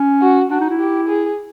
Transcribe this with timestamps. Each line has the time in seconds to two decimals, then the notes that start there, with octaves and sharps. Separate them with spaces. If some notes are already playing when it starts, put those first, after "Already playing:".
Already playing: C#4
0.22 F#4
0.51 D4 F#4
0.61 D#4
0.70 E4
0.80 G4
1.08 G#4